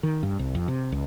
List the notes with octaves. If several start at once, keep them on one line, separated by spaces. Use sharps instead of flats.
D#3
G2
C2
F2
C3
C#2